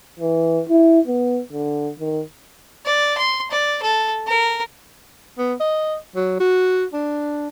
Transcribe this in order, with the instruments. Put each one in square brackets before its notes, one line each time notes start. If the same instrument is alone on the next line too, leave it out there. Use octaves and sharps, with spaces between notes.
[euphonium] E3
E4
B3
D3
D#3
[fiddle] D5
C6
D5
A4
A#4
[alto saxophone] B3
D#5
F#3
F#4
D4